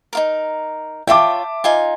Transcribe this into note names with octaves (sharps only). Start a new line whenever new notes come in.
D#4 F4 A#4
F4 C#5 E5 G5 A5 D6
D#4 F4 G#5